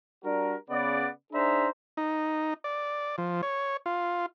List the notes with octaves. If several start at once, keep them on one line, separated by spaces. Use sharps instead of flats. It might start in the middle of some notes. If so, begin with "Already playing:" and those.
G3 D4 F#4 A#4
C#3 B3 D5
D4 D#4 G#4 C5 E5 A#5
D#4
D5
F3
C#5
F4